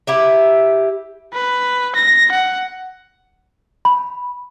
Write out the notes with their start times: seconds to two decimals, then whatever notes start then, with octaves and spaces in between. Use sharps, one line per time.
0.07 E4 G4 E5
1.33 B4
1.95 A#6
2.31 F#5
3.85 B5